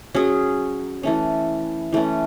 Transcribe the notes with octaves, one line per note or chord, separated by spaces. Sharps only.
F#3 C#4 G#4
E3 A3 C#4
E3 A3 C#4